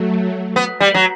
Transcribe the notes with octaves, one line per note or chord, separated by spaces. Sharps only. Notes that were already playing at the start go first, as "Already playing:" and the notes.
Already playing: F#3 A3
B3
G3
F#3